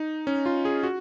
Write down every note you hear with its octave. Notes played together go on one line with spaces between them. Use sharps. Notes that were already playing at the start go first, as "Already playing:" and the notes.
Already playing: D#4
C#4
F4
G#4
F#4